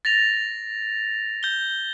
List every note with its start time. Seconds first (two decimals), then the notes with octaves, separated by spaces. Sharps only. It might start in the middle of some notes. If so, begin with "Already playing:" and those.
0.05 A6 A#6 F7
1.43 G6 G7